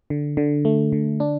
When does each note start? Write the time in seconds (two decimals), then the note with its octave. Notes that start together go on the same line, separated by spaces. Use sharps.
0.10 D3
0.37 D3
0.65 A3
0.92 D3
1.20 D4